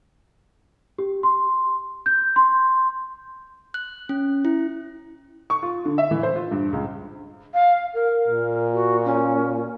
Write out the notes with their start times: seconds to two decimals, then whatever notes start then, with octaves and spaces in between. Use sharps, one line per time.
0.98 G4
1.23 C6
2.06 G6
2.36 C6
3.74 F#6
4.09 C#4
4.45 E4
5.50 C#6
5.62 F4
5.85 D3
5.98 E5
6.11 E3
6.23 C5
6.36 F4
6.51 G2
6.72 C#2
7.54 F5
7.94 A#4
8.28 A#2
8.74 F#4
9.05 C#4